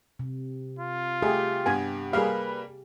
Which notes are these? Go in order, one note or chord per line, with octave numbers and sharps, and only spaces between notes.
C3
F4
A3 G4 G#4
G2 B3 G#5
G3 A#3 G#4 B4 F5